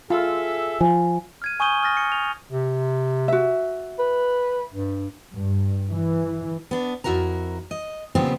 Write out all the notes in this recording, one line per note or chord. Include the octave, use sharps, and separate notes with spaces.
F4 G#4 A4 E5
F3 G#5
F6 G#6 D#7
G#5 C#6 D#6 G6 D#7 G7
D#6 F6 A6 A#6
C#7
F7
C3
F#4 E5
B4
G2
G2
E3
B3 D4
F2 E4 F#4 A#4 A#5
D#5
A#2 C#3 F3 B3 C4 G4